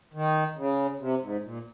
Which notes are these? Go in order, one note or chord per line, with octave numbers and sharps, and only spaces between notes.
D#3
C#3
C3
G#2
A#2